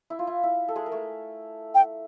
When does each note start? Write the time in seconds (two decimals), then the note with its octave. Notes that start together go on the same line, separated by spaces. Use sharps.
0.10 E4
0.19 F4
0.27 E4
0.43 E4
0.68 A4
0.76 G#3 G#4
0.86 A#4
0.92 A3 A4
1.75 G5